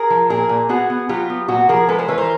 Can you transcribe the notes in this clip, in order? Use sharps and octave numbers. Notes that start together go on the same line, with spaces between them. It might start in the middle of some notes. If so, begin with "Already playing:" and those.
Already playing: G#4 A#4
F3
A#2 G#4 A#4
A#2
B3 F#4 G#4
B3
F#3 F4 G4
B3
A#2 F#4
F3 G#4 A#4
G#3 A4 B4
A#4 C5
E3 B4 C#5
A#4 C5